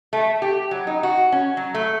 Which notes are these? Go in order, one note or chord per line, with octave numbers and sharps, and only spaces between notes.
A3
G4
F#3
D#4
F#4
C#4
F#3
A3